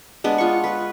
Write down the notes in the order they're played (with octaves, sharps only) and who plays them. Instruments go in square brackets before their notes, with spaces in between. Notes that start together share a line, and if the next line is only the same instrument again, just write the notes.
[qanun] G#3 B3 D4
F4 C#6
B4